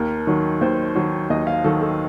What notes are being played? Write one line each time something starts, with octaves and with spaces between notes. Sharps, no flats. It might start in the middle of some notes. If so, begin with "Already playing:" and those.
Already playing: D#2 A#4
D#3 F#3
D#2 C5
D#3 F#3
D#2 D#5
F5
D#3 F#3 A4
A4